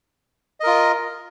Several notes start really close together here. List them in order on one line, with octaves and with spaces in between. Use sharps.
D#5 A#4 F4